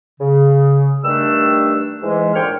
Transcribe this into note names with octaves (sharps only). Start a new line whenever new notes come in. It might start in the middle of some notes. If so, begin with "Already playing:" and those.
C#3
G2 D#3 G3 A3 D4 E6
G#2 E3 G#3
A#2 D3 C5 C#5 G5 F6